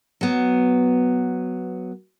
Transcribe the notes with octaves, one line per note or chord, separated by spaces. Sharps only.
F#3 B3